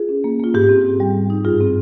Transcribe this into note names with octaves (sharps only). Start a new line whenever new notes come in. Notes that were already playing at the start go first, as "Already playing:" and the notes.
Already playing: F4 G#4
C#4
A#3
A#3 F4
G#2 G4
C4
C4
G3
G3
D#4
G2 F4 G#4
C4